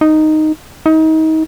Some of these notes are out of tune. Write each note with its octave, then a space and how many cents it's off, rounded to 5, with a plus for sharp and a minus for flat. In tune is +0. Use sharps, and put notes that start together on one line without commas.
D#4 -5
D#4 +30